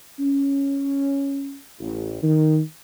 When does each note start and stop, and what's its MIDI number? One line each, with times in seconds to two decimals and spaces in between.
0.19 1.57 61
1.80 2.20 33
2.23 2.60 51